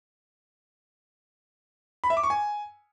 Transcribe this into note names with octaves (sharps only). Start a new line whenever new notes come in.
B5
E5
D6
C#6
G#5